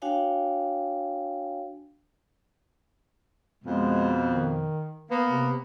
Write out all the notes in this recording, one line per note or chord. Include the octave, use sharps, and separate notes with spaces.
D4 F#4 C#5 F5 G5 G#5
F2 B2 G#3
D#3
A#3 B3
C3